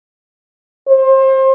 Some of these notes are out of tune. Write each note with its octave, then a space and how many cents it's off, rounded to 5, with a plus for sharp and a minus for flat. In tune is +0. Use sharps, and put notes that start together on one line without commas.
C5 +30